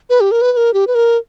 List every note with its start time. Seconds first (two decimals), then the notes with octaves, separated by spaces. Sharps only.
0.10 B4
0.21 G4
0.31 A#4
0.42 B4
0.52 B4
0.57 A#4
0.74 G4
0.87 B4
0.95 A#4